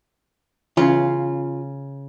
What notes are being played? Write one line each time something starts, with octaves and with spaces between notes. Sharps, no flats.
C#3 E3 C#4 F4